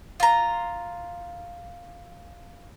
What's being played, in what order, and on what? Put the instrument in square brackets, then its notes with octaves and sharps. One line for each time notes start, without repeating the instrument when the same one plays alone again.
[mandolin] F4 A#5